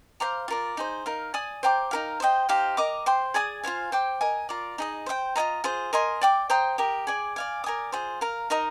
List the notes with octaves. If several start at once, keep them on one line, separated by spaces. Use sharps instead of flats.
C5 F5 A#5 D6
F4 A#4 D5
D#4 G#4 C5
D#4 A#4 F5
D5 G#5 D#6
C5 G5 A#5 D6
D#4 G4 A#4 F5
C5 D#5 G5
D#4 G4 C5 F5
A#4 D#5 A#5 D6
C5 G5 C6
G#4 D5 G#5 D#6
F4 C5 F5 G#5
C5 G5 D6
A#4 D#5 G#5
F4 A#4 D5
D#4 G#4 D#5
C5 D#5 G5
F4 G#4 D#5 A#5
F4 G#4 C5
A#4 D#5 G#5 C6
D5 G5 D6
C5 G5 A#5 D#6
G4 A#4 D#5
G#4 D5 G#5
D5 F5 G#5
A#4 D5 G#5 D#6
F4 G#4 C5
A#4 F5 A#5
D#4 A#4 D#5 A#5